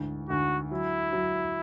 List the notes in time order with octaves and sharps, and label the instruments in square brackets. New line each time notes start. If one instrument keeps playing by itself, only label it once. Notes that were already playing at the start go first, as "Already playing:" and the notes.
Already playing: [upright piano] D2 G#2 E3
[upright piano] D2 [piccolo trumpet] F#4
[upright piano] F#3 [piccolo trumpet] E4
[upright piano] F#3